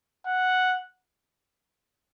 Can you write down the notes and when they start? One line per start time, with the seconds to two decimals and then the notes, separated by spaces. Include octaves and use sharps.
0.26 F#5